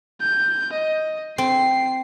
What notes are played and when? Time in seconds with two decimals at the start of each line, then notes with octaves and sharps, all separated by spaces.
0.20 G6
0.73 D#5
1.38 C4 C7